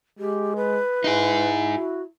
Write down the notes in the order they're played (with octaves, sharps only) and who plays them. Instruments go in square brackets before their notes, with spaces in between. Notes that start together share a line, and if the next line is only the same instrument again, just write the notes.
[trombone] G#3 [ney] G4
[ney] B4
[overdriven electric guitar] D#4 G#4 [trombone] E4
[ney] F#4